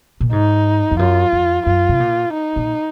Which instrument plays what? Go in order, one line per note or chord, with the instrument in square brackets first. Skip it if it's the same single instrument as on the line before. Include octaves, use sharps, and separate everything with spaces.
[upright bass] A#2
[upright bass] G#2 [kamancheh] D#4
[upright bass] F2
[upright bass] F#2 [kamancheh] F4
[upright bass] F2
[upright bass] F#2 [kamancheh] F4
[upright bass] C3
A#2
[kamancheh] D#4
[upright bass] A#2